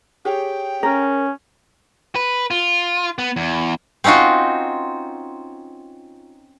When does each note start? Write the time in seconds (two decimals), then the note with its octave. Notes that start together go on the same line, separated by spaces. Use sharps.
0.25 G4 G#4 C#5 G5
0.83 C#4 A#4
2.16 B4
2.51 F4
3.18 B3
3.36 E2
4.04 C4 C#4 D#4 F4 F#4